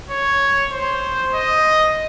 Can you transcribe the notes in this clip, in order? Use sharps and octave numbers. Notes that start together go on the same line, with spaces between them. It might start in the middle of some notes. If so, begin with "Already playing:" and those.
C#5
C5
D#5